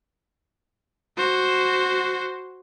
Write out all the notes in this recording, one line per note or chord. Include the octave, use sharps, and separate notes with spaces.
F#4 C5